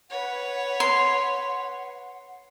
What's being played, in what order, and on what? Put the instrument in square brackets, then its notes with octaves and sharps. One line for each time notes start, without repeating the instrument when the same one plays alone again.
[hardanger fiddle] B4 C#5 [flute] F#5
[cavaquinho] C6